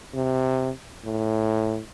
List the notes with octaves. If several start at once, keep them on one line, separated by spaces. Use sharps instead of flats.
C3
A2